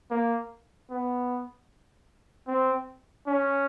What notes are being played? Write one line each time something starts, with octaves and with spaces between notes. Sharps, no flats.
A#3
B3
C4
C#4